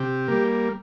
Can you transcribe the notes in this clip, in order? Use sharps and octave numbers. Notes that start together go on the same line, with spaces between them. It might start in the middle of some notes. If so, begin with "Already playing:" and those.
Already playing: C3 G4
G3 A#3